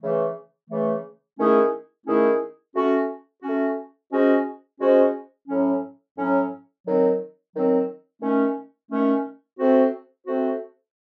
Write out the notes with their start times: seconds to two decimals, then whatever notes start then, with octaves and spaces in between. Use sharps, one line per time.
0.02 C#3 E3 A3
0.70 C#3 E3 A3
1.38 D#3 A3 C#4 E4 G#4
2.06 D#3 A3 C#4 E4 G#4
2.76 A3 C#4 F#4
3.43 A3 C#4 F#4
4.12 G#3 C#4 F#4 C5 D#5
4.80 G#3 C#4 F#4 C5 D#5
5.48 A2 F#3 C#4
6.17 A2 F#3 C#4
6.85 D#3 F#3 C4
7.54 D#3 F#3 C4
8.22 D#3 A3 C#4
8.90 D#3 A3 C#4
9.59 A3 C4 F#4 C5
10.27 A3 C4 F#4 C5